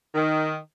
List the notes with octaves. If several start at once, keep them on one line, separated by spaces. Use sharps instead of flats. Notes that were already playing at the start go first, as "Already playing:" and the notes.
D#3